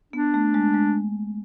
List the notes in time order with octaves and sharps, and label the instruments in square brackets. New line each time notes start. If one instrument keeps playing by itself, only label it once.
[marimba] B3 [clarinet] D4
[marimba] A3
G#3
G#3